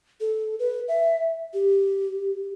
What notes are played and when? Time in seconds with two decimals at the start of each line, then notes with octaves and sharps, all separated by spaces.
0.21 A4
0.59 B4
0.88 E5
1.54 G4